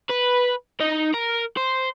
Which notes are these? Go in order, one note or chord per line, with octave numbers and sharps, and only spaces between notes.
B4
D#4 D#5
A#4
C5